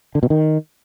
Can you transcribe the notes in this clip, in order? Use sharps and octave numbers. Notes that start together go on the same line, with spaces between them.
D3
B2
D#3